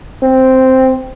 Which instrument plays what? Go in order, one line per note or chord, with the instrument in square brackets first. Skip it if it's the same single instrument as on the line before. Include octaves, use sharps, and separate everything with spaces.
[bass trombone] C4